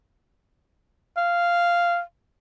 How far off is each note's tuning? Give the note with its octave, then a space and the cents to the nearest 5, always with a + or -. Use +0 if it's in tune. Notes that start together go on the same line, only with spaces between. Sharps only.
F5 -5